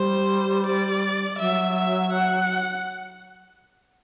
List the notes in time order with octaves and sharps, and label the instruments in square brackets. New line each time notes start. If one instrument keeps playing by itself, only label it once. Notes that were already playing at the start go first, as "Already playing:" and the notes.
Already playing: [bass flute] G3 [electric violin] C5
[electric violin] D5
[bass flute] F#3 [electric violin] E5
[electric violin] E5
F#5